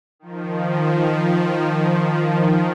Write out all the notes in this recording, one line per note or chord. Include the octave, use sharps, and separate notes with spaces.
D#3 F3